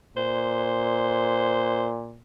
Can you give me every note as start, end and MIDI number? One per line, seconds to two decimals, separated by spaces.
0.17 2.21 46
0.17 1.88 72